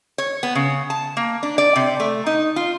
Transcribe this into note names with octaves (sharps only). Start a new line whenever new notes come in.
C#5
B3
C#3
A5
A#3
D4
D5
C3
A3
D#4
F4